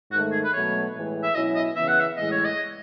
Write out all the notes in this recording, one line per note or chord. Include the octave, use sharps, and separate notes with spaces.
G#2 D#3 A3 F#4
G#4
B4
B2 F#3 A3 C#5
A2 E3 G#3
E5
B2 F#3 C#4 E4 D#5
D#5
C#3 E3 B3 E5
F#5
E5
A2 E3 G#3 D#5
C#5
D#5